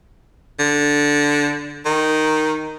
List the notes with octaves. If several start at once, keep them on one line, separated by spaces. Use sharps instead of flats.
D3
D#3